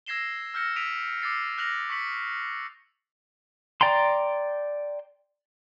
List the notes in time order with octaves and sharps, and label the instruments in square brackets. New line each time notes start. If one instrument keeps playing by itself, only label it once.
[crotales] E6 G#6 A#6 C7 E7 G7
E6 F6 G6 A#6 C#7
D#6 E6 B6 D7 D#7 F7
D6 E6 A6 C7 C#7
F6 F#6 A#6 F7 F#7
C#6 B6 C#7 F#7
[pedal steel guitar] D5 G5 A#5 C6